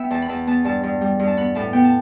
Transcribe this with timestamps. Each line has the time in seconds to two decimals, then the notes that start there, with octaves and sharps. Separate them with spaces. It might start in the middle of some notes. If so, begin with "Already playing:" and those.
Already playing: B3 E5 G5
0.10 E2 A5
0.22 B5
0.29 E2 A5
0.47 B3 A5
0.65 G2 A5
0.83 G2
1.01 G3
1.19 G2
1.27 A5
1.37 B3 B5
1.55 A2 A5
1.73 B3 G5
1.84 A5